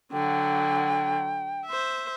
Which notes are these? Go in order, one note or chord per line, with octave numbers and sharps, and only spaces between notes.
D3 F#3 G5
C5 E5